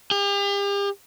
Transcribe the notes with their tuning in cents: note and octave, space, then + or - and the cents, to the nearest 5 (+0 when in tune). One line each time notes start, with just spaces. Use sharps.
G4 +40